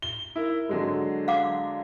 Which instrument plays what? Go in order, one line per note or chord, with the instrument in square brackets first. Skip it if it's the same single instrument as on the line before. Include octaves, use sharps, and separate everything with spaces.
[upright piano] G7
E4 A#4
D3 F#3 G#3
[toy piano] F5 F#5 D6